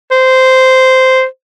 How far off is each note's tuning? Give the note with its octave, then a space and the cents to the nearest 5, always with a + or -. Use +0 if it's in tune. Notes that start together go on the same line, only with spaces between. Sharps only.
C5 -10